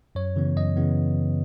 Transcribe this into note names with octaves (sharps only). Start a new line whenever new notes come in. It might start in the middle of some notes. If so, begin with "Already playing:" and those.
F#2 C#5
C#3 E3 B3
F#2 D#5
C#3 E3 B3